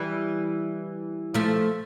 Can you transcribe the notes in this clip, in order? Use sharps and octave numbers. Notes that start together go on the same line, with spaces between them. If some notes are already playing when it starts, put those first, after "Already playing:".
Already playing: E3 G3
F3 A3